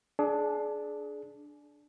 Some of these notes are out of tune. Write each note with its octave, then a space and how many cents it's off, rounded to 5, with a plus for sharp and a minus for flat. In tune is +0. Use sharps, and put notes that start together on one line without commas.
D4 +0 G#4 +30